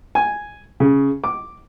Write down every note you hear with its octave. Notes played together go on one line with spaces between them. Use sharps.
G#5
C#3
D6